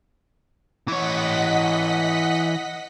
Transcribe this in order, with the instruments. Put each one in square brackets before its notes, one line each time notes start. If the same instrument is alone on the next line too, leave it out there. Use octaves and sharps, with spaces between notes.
[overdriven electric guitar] E3 C#5 [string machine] D#5 F#5 B6